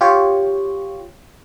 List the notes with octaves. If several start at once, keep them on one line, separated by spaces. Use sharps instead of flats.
F4 G4 C#5